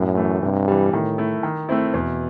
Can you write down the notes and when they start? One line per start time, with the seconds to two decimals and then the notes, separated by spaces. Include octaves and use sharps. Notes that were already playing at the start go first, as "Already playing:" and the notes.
Already playing: F#2 A2
0.17 E3 A3
0.42 G2 C3
0.68 E3 G3
0.92 A2 D#3
1.18 A3 E4
1.43 D#3
1.69 A3 C4 E4
1.93 E2 B2